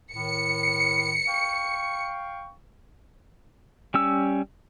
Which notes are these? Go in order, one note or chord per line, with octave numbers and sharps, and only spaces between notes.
A2 D#3 C#7
F5 G5 C#6
G3 C#4 E6